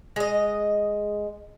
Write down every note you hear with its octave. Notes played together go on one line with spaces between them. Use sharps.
G#3 D#5